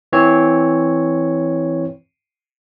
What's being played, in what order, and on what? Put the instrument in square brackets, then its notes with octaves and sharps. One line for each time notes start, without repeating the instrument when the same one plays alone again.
[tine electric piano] E3 C4 C#5